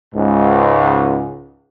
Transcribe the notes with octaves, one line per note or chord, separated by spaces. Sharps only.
C#2 G#2